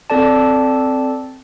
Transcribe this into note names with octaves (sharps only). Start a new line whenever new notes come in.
C4 A4 D5 A5